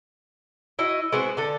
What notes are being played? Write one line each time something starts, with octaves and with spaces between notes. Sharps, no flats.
E4 F#4 D#5
G#3 B3 C4 F#4
D3 A4